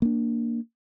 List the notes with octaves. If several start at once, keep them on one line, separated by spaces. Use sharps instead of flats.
A#3 D4